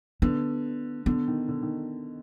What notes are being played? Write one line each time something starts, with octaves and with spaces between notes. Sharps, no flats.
D3 B3
D3 B3
D#3
D3
D#3